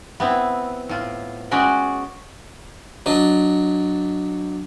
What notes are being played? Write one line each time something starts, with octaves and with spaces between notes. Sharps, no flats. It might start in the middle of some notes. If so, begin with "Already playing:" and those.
B3 C4 E4
A2 F4
G#3 C#4 F#4 D5 G5
F#3 D4 D#5